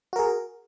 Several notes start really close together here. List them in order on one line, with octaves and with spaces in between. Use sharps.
F#4 A#4 G#4